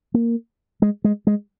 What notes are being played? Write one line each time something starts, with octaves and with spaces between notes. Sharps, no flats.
A#3
G#3
G#3
G#3